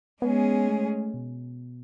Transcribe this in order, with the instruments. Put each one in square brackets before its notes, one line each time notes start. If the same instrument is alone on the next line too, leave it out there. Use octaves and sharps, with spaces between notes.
[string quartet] G#3 C#4 G#4 [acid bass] B3
[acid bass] A3
B2